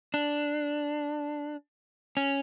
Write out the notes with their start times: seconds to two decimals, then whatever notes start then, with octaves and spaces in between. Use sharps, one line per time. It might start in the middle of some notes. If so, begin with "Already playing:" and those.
0.14 D4
2.17 C#4